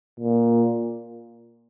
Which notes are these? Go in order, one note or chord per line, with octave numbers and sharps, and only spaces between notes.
A#2